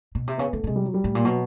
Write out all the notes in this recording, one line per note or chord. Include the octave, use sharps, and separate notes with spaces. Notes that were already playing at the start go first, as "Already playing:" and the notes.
B2
C3
C#3 B3
D3 A3
B2
C3 G#3
G3
F#3
G3
A2
A#2
B2 F#3